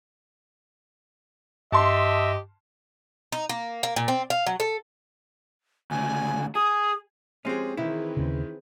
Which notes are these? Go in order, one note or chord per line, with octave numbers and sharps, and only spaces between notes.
G2 G4 D#5 E5 A5 C6
D#4
A#3
A#3
A#2
C4
F5
F#3
A4
D2 C#3 G#5
G#4 D#6
F3 G#3 C4 C#4 G4 G#4
D#3 E3 C4 E4 G#4 B4 E5
D#2 C#3